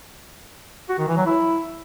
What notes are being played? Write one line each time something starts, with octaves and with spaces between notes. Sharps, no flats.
F#4
D#3
E3
F#3
E4